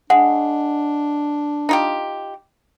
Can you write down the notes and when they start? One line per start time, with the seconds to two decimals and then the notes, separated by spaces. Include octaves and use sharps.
0.10 G#3 D4 F#5
1.69 D#4 F4 G4